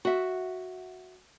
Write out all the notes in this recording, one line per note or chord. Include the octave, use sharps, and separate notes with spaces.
F#4 E5